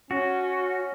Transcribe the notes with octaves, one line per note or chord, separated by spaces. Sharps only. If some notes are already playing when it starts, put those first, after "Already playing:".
C#4 F#4